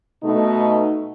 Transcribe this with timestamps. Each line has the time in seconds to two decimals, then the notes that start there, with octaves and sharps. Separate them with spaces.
0.23 B2 A3 D#4